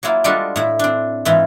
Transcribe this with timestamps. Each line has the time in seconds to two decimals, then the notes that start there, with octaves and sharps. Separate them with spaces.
0.03 F#3 A#3 E4 F4
0.24 G3 G#3 D4 F4 F#4 A4
0.56 A2 E4
0.79 C4 D4
1.25 G#2 E3 E4 F4